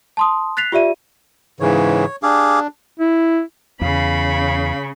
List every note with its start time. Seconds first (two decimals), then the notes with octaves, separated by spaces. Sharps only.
0.17 A5 C6 D#6
0.57 F#6 A6 B6 C7 F7
0.72 F4 G4 D5 E5 D#7
1.60 G#2 C#3 E3 C#5
2.23 D4 G4 G#4 F5
3.00 E4
3.81 E2 C#3 F5 B5